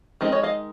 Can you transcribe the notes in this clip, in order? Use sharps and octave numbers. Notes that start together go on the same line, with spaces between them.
D#3 G#3 C4 D#4
C#5 D#5
D#5 F5